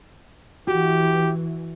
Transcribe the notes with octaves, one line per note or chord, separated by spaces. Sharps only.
E3 F#4 G4